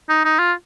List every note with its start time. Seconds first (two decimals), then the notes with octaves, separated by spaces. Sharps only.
0.09 D#4
0.25 D#4
0.39 F4